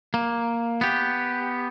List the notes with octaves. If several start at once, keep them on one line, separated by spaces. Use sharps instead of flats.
A#3
B3 G4